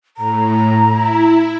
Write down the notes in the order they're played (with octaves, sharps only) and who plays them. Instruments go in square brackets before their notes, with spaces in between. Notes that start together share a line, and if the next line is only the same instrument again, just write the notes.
[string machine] A2 [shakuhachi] A#5
[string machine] E4